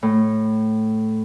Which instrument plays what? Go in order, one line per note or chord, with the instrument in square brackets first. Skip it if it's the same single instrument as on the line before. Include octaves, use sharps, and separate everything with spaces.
[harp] A2